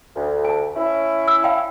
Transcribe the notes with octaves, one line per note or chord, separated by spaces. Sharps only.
D2
G#5 A5
C#4 E4
E6
F5 G5 A5